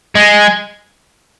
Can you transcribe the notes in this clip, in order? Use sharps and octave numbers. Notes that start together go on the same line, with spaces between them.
G#3